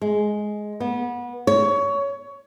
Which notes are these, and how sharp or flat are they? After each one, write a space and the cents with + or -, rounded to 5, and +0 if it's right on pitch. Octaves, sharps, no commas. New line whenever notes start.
G#3 +10
B3 -25
C#5 +20